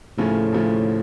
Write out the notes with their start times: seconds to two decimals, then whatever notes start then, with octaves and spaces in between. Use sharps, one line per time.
0.18 D#2 A2 C#3 F3 A3 C#4
0.52 D#2 C#3 F3 A3 C#4